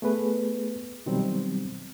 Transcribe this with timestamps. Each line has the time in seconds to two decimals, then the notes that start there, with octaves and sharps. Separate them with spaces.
0.02 A3 B3 G#4 B4
1.06 B2 D#3 F#3 G3 C4